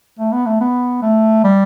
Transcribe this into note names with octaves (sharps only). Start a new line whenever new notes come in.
A3
B3
A3
B3
A3
G3